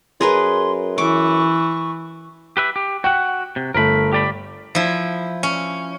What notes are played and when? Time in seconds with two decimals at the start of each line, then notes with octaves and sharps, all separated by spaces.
0.21 F#2 G#4 A#4 B4 C6
0.98 E3 C#6 D6
2.57 G4 B4 E5
2.76 G4
3.04 F#4 F#5 G5
3.56 C3
3.74 G1 A3 A#4 B5
4.13 G4 D5 B5
4.75 F3 E4
5.43 C#4